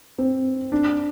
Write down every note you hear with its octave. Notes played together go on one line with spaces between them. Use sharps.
C4
D4